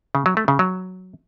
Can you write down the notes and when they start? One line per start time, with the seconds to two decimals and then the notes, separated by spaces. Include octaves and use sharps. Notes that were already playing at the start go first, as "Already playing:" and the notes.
0.15 C#3
0.26 F#3
0.37 A3
0.48 C#3
0.59 F#3